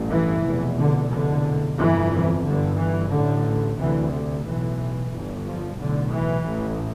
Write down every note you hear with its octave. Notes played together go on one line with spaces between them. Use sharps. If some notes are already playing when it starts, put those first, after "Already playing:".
Already playing: A1 G2
E3
F1 E2 B2
D3
F1 E2 B2 D3
G1 F2 C3 E3
G1 G2 D3
E3
A1 A2 D3
D2 C3 E3
D3
B1 A2 E3
G1 G2
F3
B1 A2 D3
E3
A1 A2